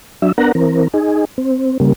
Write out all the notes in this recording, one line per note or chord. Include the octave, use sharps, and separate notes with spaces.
F#3 D4 E5
B3 D4 A#4 F#5 A#5
E3 C4 A#4
D#4 G#4
C4
C#3 G3 A#3